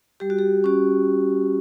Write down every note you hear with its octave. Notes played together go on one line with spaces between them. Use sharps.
G3 G4
F#4
G4
C#4 F#4